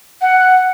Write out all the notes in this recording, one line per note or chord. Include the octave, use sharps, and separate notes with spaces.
F#5